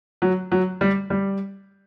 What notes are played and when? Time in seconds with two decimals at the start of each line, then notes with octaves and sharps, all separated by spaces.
0.22 F#3
0.52 F#3
0.81 G3
1.10 G3